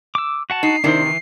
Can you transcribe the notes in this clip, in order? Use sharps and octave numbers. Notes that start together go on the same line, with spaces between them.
D6 E6
F#4 F#5 A5
D#4 C7
C3 D#3 D4 E4 C5
E3